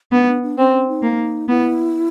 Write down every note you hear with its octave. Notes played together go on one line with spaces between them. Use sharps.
B3 D4
D#4
D4
D4
C4 C#4
C#4
D#4
A#3
B3 E4